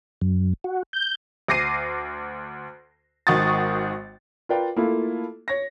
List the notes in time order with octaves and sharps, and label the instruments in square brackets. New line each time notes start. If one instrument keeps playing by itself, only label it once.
[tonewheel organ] F#2
F#4
G6
[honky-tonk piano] D2 D6 A#6 C7 D#7
G#1 D#3 F#4 C#6 D#6 A6
[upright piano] F4 A#4 B4 D5 F5 G5
A3 A#3 E4 F4 A4
C#5 A#6